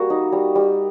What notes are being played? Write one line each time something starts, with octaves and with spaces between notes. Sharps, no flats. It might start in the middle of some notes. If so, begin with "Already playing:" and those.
Already playing: G3 A#3 F#4
D#4
G3
G3